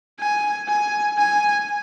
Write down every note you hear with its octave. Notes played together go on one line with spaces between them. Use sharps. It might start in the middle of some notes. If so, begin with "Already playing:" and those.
G#5
G#5
G#5